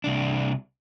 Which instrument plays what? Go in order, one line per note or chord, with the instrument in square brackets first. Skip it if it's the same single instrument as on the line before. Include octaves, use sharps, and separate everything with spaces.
[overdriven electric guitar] C2 D4